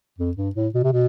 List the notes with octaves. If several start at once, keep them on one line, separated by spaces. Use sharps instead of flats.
F2
G2
A2
B2
C3
B2